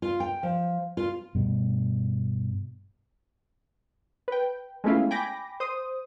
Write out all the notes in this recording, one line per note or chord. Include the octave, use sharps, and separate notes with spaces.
F4
G5
F3
F4
G2 B2
B4 G5
G#3 A3 B3 C#4 E4 F4
G5 G#5 B5 D6 A#6
C5 D#6